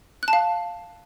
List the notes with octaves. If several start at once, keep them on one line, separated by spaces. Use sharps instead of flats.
F#6
A5
F5